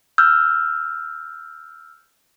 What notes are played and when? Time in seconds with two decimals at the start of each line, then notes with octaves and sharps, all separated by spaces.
0.18 E6 F6 G6